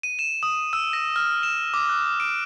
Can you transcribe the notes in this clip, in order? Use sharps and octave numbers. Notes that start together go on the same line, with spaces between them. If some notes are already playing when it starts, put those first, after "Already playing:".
D#7
E7
D#6
E6
A#6
F6
E7
D6
F#6
D7